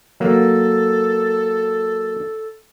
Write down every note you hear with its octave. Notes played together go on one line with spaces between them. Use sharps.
F#3 A#3 A4